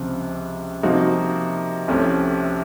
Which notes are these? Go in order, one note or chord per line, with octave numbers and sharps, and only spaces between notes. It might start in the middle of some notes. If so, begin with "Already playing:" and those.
Already playing: C#2 C3 F3
C3 F3 A#3 D#4 F#4
C2 C3 F3 A3 C#4